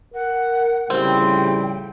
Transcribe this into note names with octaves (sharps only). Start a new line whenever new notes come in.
A#4 F#5
A2 C#3 F3 G3 C4 G5